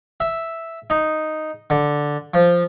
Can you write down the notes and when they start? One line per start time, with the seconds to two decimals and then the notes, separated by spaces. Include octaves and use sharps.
0.20 E5
0.90 D#4
1.70 D3
2.34 F3